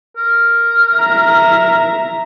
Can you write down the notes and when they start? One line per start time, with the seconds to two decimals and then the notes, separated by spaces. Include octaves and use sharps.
0.17 A#4
0.96 E5 A#5